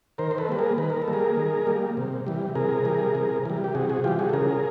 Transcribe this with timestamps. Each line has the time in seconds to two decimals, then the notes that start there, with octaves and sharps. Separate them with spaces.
0.18 D#3 A#4 C5
0.31 C5
0.38 A4 B4
0.49 G3 A#3 B4
0.58 G#4 A#4
0.78 D#3 B4
0.90 A#4
1.02 A4
1.08 G3 A#3
1.13 G#4 A#4
1.37 D#3
1.67 G3 A#3
1.97 C3
2.27 E3 G3
2.55 C3 G#4 A#4
2.85 E3 G3
3.15 C3
3.45 E3 G3
3.64 G4
3.75 C3 F#4 G#4
3.89 F#4 G#4
4.04 E3 G3 F4 G4
4.19 F#4 G#4
4.29 A4
4.33 C#3 G#4 A#4